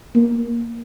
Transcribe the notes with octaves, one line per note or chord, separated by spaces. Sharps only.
A#3